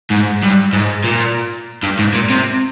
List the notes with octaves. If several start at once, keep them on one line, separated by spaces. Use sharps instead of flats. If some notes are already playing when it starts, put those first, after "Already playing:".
G#2
G2
G#2
A#2
G2
G#2
A#2
C3